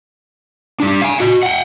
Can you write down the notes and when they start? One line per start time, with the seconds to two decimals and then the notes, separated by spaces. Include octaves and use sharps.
0.80 G3 D4
1.02 F5 G#5
1.20 F#4 D#5
1.43 F#5 G5